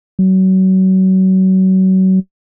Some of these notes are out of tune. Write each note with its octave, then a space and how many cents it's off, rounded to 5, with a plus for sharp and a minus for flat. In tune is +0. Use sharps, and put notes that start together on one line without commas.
F#3 +30